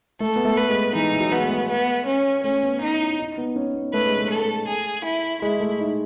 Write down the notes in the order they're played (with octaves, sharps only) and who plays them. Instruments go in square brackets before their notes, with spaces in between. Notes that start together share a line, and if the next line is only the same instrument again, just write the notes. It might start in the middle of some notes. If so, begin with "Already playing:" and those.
[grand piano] A3 [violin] A4
[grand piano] B3
A3
[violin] B4
[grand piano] G#3
[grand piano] E3 [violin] D#4
[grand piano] E3
F#3
[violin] B3
[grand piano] G#3
A3
[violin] B3
C#4
[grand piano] A3 [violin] C#4
[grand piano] B3
[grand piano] C#4 [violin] D#4
[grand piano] E4
D#4
B3
C#4
B3
[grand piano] A3 [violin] B4
[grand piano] G#3
A3
[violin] A4
G#4
E4
[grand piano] G#3 [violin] E4
[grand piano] A3
D#4